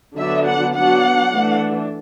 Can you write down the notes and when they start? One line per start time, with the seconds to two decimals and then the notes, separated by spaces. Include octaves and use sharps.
0.17 D3 F#3 B3 D4 E5
0.46 F#5
0.75 F#3 B3 D4 F#5
1.32 E3 A3 D4